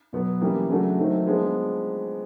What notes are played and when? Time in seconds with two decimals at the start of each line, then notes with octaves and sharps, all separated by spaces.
0.13 B2 F#3 B3
0.41 E3 G3 A#3 C#4
0.69 C#3 F#3 A3 D4 F#4
0.98 D#3 F#3 A3 C4
1.26 F3 G#3 B3 D4